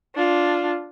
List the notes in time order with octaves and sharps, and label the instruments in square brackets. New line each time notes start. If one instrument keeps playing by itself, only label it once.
[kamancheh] D4 F4